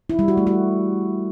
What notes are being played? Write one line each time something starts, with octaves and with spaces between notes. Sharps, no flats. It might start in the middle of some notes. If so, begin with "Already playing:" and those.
E4
G3
F#4
A3
F#4